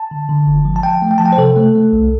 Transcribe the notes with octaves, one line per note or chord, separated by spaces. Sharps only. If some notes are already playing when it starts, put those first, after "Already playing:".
Already playing: A5
D3
D3
G1
F3
A5
F3 G5
A3
G5
F3 A5
G5
C5
C3 A4
A3
A3
C2